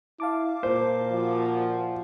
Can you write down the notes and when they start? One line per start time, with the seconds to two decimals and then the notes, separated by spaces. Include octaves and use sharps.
0.20 E4 F5 A5 D6
0.63 A#2 C5
1.12 F3 F#4